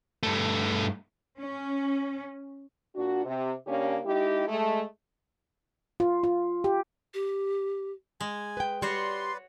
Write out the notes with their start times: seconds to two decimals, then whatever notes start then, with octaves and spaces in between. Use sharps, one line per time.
0.23 G2 A3
1.38 C#4
2.95 A#2 D4 F#4
3.25 C3
3.67 C#3 A#3 C#4 D4 G4
4.05 G#3 D#4 E4 G4
4.48 G#3 A3
6.00 F4
6.24 F4
6.64 G4
7.14 G4
8.20 G#3 G#5
8.57 B4 G5
8.82 G3 F#4 B4 C#5 D5 C6